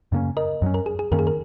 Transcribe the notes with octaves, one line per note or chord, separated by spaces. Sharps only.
F#2 C#3 A#3 C#4
A#4 D#5
F#2 F#3 C#4
A#4
G#4
G#4
F#2 D#3 A#3 C#4 A#4
G#4
A#4